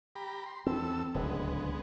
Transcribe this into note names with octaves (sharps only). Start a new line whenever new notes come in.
G4 A#5 B5
C6
E2 C4 A4 E6
D1 C#2 D3 G#3 B3